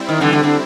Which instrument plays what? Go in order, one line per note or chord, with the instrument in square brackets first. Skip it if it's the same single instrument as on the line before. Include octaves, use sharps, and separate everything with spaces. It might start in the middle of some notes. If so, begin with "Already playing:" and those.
Already playing: [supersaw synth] G3 C4 E4
[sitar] D#3
D3 E3
D3
D3